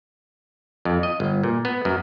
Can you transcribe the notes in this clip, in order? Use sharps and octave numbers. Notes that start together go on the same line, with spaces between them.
F2
D#5
G1
A#2
B3
F#2